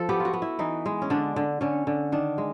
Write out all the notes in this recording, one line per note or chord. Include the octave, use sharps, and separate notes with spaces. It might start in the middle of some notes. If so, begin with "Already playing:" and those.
Already playing: F3 A4
B3 G4
F4 F#4
B3
E4
E3 D#4
G#3
C#4
D3 D4
D3
D3 C#4
D3
D#3 D4
G#3